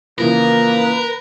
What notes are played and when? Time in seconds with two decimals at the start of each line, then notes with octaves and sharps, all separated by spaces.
0.18 C#3 E3 F3 A#3 A#4 B4